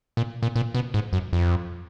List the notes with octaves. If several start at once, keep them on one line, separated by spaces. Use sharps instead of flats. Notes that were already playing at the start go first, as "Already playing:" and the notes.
A#2
A#2
A#2
B2
G#2
F#2
F2